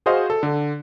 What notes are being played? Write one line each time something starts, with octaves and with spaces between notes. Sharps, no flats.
F#4 G#4 C5 D#5 F5
A4
D3